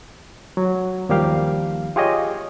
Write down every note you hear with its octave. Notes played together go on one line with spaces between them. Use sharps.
F#3
D#2 F3 G3 A#3 G4 F5
F4 G4 G#4 C#5 D#5